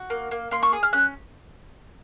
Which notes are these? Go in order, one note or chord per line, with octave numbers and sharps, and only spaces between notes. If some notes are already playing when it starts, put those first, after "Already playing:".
Already playing: F#4
A#3
A#3
A#3 C6
C#6
G#4 D#6
F6
C#4 F#6